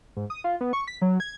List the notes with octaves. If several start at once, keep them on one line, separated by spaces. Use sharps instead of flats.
G#2
D#6
F4
B3
C#6
B6
F#3
G#6